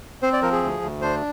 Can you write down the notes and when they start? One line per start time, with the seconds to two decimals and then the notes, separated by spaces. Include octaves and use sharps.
0.22 C4 C5
0.33 D5
0.42 F3 A#4
0.52 G#4
0.63 D2
0.82 D2
1.02 D4 C5